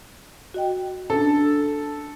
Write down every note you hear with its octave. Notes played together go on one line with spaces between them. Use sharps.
F#4 D#5 G5
C#4 D4 A4